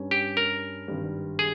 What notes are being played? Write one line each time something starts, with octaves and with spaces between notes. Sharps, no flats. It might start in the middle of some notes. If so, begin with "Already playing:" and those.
Already playing: G2 G3 C#4
G4
A#4
G#1 G2 G3
G#4